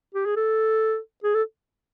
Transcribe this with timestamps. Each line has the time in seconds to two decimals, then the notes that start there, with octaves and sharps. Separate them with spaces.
0.15 G4
0.25 G#4
0.36 A4
1.24 G#4
1.35 A4